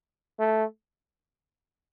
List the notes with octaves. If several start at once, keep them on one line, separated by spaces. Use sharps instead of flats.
A3